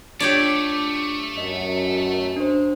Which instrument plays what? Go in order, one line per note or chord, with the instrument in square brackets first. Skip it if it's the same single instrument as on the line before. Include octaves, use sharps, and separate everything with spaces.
[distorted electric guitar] A3 [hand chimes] D4 F4 D6 [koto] G4 C#5 D5
[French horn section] F#2 [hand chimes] D#5
[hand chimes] D4 C5